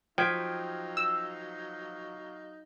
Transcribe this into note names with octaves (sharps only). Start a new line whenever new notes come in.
F3 F#3 D#4 F5 G5 G#6 B6
E6